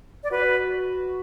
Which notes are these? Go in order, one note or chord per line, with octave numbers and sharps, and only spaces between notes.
D5
F#4 B4